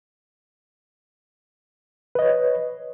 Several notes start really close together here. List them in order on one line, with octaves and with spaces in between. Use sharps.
B4 D#5 C#5